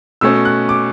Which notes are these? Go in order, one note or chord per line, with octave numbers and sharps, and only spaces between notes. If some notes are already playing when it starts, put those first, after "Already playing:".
B2 A3 C#4 E6
F#6
D6